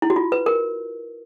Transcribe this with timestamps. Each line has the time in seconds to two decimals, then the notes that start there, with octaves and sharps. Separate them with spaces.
0.02 E4
0.10 F#4
0.16 F4
0.32 B4
0.46 A#4